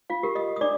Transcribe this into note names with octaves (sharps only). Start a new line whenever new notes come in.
F4 F5
G4 A#4
D#5 D#6
D#6
D4 D5 D6